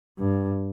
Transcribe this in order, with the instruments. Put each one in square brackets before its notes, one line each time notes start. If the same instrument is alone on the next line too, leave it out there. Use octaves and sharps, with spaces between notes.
[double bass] G2